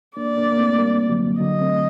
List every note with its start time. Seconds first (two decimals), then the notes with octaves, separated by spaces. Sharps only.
0.17 A#3 D4 D5
0.37 A#3 D4
0.52 A#3
0.58 A3 C4
0.79 G3 A#3
1.09 D3 F#3
1.40 D3 F#3 D#5
1.61 A3 C4